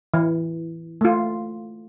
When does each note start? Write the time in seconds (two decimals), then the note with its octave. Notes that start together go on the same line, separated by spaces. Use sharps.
0.14 E3
1.01 A3 F4